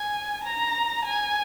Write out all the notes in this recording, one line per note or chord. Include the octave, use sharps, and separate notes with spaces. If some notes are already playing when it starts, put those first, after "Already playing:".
Already playing: G#5
A#5
G#5